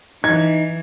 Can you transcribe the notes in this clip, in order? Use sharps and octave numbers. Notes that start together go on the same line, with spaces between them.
E3 D#4 G#6